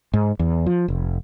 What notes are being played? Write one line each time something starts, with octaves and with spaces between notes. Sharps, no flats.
G#2
E2
F3
F1